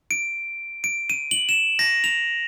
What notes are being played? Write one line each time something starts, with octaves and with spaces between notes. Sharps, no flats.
D7
D7
D#7
F#7
E7
A#6
F7